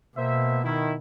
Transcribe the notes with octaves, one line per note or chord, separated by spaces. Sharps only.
B2 A#3 C5 E5
D#3 E4